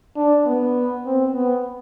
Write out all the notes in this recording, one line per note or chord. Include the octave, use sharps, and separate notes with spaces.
D4
B3
C4
B3